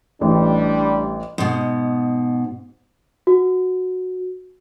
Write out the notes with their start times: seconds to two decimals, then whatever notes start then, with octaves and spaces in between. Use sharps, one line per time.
0.21 A1 G3 D4
1.38 G#2 B2
3.27 F#4